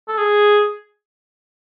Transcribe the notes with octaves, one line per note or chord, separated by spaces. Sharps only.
A4
G#4